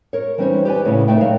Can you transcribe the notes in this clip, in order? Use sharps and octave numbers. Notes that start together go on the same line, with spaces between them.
A#4 C#5
E3 G3 C#4 D#4 C5 C#5
G4 B4 D5 G#5
A2 C#3 C#4 E4
A3 D#4 B4 D5 E5 G5
A#2 F#3 A#3 D5 F5